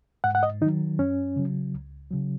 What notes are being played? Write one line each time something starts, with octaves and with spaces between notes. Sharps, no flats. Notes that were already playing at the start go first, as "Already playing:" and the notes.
G#2 F#5
F#5
D#5
D#3 F#3 D#4
F#2 C#4
C#3 F#3
C#2
C#3 F#3